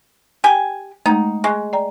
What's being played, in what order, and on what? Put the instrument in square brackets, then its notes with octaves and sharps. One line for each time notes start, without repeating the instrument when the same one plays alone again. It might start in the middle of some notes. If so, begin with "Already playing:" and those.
[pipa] G4 G5 G#5
[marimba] G#3 A3 [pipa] D#4
[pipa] G#3 [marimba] C#6 F#6
[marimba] D5 G5 A#5